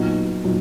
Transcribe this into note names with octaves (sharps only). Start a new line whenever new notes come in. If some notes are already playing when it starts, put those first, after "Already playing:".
Already playing: A#2 F#3 B3 D#4 F#4
A#2 F#3 D#4